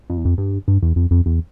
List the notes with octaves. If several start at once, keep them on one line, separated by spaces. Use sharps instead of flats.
F2
E2
F2
G2
G2
E2
F2
F2
E2